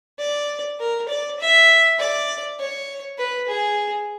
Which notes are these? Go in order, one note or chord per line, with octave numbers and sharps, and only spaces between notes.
D5
A#4
D5
E5
D5
C#5
B4
G#4